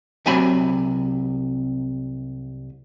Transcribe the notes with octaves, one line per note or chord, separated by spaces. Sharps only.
C2 C3 F#3 G#5 B5